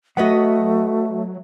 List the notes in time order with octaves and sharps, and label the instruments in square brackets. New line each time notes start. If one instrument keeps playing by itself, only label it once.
[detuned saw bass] F#3 [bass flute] A3 [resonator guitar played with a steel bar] B3 B4 D#5 [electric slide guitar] F#4 E5 F#5